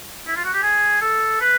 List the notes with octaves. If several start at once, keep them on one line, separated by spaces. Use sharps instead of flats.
E4
F4
F#4
G4
G#4
A4
B4